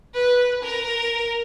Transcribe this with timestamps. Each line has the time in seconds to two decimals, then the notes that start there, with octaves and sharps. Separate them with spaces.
0.14 B4
0.62 A#4